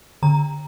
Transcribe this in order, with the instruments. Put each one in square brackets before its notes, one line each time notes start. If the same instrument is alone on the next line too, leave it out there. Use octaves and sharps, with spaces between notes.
[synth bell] D3 A#5